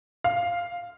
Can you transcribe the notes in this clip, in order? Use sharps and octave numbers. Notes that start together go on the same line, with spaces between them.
F5